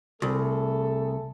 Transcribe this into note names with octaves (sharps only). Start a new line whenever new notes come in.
C2 A3 G#4 A4